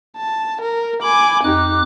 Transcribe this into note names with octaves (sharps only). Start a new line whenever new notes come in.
A5
A#4
G#5 B5 D6
F2 D#4 G4 D6 F#6